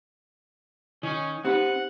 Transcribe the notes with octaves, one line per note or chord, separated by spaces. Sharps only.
D#3 C#4
C4 D#4 G4 B4 F#5